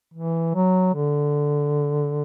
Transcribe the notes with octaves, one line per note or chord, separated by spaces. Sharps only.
E3
F#3
D3